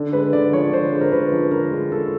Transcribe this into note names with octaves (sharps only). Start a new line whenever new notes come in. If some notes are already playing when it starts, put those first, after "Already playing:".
Already playing: D3
G#3 B4
D3 D5
F3 C#5
D3 C5
G#3
A#4
D3 B4
F3
D3 A#4
G#3
D3 A4